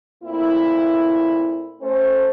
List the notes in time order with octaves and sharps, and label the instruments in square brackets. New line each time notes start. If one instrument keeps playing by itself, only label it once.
[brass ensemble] A#2 A3 A#3 C4 E4
A3 C#4 C5